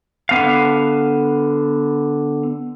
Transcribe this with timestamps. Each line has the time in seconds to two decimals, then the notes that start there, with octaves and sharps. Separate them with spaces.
0.29 D3 B3 F5